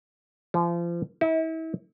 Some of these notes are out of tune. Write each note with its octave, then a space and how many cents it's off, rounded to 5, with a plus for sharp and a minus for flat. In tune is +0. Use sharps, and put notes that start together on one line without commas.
F3 -35
E4 -40